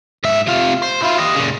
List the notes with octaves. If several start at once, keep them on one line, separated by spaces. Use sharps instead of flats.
G#2 E5
C3 F4
C5
E4 F4
G4 D#5
A#2 C#3